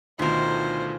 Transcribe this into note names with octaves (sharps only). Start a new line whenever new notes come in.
D2 B2 D#3 F4 A#4 C5